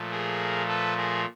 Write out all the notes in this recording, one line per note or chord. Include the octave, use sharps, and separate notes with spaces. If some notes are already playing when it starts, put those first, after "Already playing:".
Already playing: A#2 F3 A3
G#4 A#4
A4 B4
G#4 A#4